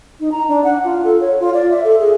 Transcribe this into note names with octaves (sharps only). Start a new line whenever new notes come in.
D#4
A#5
D4
F#5
F4
A4
C#5
F4
D5
E5
A4
G#4